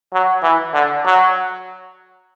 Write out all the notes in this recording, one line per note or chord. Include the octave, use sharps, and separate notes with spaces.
F#3
E3
D3
F#3